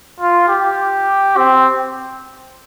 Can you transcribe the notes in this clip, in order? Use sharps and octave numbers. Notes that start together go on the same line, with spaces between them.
F4
G4
C4